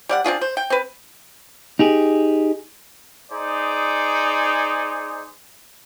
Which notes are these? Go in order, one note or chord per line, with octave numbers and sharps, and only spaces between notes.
G3 D5 F#5
C4 D4 F4 G#4
C5
G5
C4 B4
D#4 G4 G#4
D#4 G#4 C5 D5